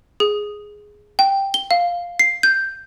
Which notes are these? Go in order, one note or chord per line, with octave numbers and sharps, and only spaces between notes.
G#4
G5
G7
F5
C7
G6